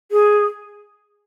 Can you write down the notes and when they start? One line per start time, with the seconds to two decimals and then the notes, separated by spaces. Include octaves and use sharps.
0.12 G#4